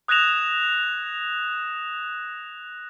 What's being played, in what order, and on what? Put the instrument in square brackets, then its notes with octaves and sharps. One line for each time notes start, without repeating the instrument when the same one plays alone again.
[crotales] D#6 F#6 G#6 A#6 E7 F7